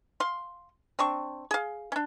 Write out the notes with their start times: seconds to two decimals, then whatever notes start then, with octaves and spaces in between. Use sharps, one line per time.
0.20 F5 C6
0.99 C4 D4 C#6
1.51 G#4 F5
1.92 C#4 D4